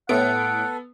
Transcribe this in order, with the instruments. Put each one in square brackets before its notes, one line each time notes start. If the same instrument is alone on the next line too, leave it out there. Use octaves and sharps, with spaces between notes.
[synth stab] A2 D7 [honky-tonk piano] B3 [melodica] A4 [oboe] F#5